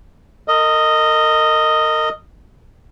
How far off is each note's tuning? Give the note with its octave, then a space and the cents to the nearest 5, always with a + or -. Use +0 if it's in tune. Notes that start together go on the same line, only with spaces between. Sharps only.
A#4 -35 D#5 +0